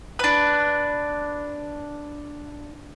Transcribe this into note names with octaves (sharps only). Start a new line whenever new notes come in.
D4 B4